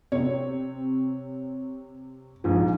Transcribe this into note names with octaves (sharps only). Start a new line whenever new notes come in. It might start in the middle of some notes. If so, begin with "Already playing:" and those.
C3 C4 C#5
A#1 G#2 F3